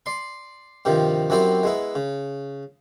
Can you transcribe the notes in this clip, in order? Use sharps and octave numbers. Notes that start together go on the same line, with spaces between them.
D5 C6
G2 C3 D#3 F3
F#2 F#3 C4 E4 G4 D5
G#3 B3 E4
C#3